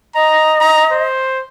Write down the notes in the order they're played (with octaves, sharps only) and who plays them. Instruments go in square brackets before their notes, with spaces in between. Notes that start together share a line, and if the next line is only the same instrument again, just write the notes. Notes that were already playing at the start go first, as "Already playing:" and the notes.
[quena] D#5 [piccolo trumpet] A#5
[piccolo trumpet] A#5
C5